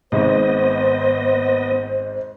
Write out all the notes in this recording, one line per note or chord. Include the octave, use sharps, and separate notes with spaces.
G#1 G#2 B3 C5 D#5